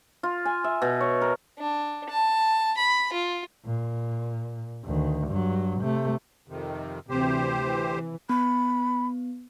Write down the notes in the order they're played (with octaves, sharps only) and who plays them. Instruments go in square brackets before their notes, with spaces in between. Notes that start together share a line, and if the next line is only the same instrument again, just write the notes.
[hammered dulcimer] F4
G#5
E5
B2
C#5
A#4
[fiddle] D4
A5
B5
F4
[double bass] A#2
D2 D#3
G2 F#3
C3 A3
[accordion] F2 C3 D#3
[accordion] D2 G4 C5 [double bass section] C3 E3 C4
[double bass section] E3
[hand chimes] B3 [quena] B5